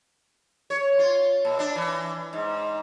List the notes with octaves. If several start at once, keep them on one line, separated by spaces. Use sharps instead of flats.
C#5
F4
A#2
D4
E3
G#2